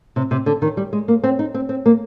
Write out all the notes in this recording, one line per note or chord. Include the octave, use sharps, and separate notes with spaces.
C3
C3
D3
D#3
G3
G#3
A#3
C4
D#4
C4
C4
A#3